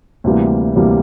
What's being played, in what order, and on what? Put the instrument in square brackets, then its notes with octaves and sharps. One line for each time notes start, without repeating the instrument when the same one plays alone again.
[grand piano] D2 C3 E3 G3 A#3
D2 C3 E3 G3 A#3